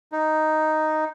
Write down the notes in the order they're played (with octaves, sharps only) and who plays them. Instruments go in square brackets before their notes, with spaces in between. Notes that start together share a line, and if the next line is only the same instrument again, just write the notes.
[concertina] D#4